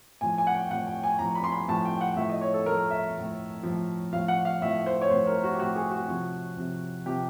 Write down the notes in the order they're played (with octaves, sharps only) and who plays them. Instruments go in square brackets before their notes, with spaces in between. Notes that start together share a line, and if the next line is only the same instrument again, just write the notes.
[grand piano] A2 F3 G#5
G#5
F#5
G5
A2 F3 F#5
G5
G#5
A2 F3 A#5
B5
C6
B5
A2 F3 A5
G5
F#5
A2 F3 E5
D#5
C#5
A4
A2 F3 A#4
E5
F3
A2
F3
A2
A2 F3 F5
F#5
F5
A2 F3 E5
C5
C#5
A2 F3 C5
A#4
F#4
G4
A2 F3 F#4
G#4
F#4
C3 F3
C3 F3
C3 F3 G4